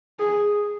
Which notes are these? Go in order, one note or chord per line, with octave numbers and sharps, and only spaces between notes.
G#4